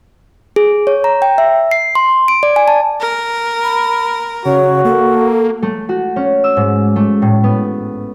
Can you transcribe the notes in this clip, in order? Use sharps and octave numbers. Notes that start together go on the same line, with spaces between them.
G#4
C#5
A#5
G5
E5
C7
C6
D7
D5
G#5
A5
A#4
B5
C#3 F#4 C#5
A#3 A4
A3
F#4
C#4
E6
G#2
A3
A2
B3